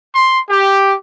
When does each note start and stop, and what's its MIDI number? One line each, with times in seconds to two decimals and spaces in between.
0.15 0.40 84
0.50 0.95 67